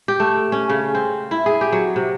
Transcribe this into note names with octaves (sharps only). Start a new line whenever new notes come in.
G4
A3
C#4
C#3
C4
E4
G#4
G4
F#3
C3